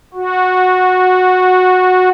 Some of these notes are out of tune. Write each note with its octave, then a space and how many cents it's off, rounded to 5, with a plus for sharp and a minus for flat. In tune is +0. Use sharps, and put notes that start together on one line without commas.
F#4 -15